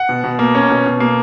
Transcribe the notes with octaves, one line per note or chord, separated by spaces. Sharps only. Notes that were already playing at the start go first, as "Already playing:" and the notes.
Already playing: F#5
B2
B2
A#3
C#4
B2
B2
A#3